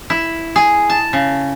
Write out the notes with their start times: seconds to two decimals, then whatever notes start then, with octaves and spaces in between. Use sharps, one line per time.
0.10 E4
0.56 G#4
0.90 A5
1.13 C#3